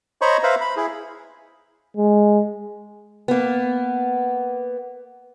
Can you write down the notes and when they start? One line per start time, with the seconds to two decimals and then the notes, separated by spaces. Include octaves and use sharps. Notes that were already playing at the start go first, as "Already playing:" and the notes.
0.21 C5 C#5 D#5 A#5 B5 C#6
0.43 B4 C5 E5 F5 A#5 B5
0.61 B5
0.77 E4 G#4
1.97 G#3
3.28 A#3 B3